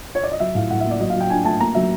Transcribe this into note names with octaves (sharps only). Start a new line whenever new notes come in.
C#5
D5
D#5
F#3 E5
A2 F5
A2 F#5
E5
A#3
D5
F#3 D#5
F5
F#3
G5
D4 G#5
A3 A5
A#3 A#5
F#3 E5